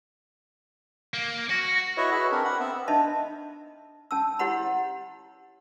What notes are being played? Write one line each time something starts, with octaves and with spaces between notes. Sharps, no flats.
A#3
F#4 A#6
E4 F#4 B4 C#5 D#5 E5
F#4 G#4 B4 E5 B5
C4 D4 A#4
F#5 B5
B3 C4 E5
D4 D#4 D#5 E5 A5
C#4 A5 E6
E4 G4 C#5 F#5 B5